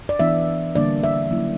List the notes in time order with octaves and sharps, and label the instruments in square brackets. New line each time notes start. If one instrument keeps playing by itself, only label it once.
[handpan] D5
E3 B3 D4 E5
D3 G3 A#3 D4 D5
E5
F#3 A#3 C#4 E4